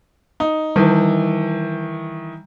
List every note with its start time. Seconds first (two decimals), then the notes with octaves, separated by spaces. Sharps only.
0.40 D#4
0.76 D#3 E3 G3